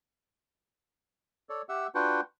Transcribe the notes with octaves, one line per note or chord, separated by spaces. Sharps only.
A4 C#5 D5
G4 E5 F#5 E6
D4 F4 F#4 B4 F#5 G5